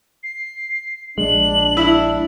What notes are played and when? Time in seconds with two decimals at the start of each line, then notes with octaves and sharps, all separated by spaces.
0.23 C7
1.18 A#1 G#3 D4 F#7
1.77 E4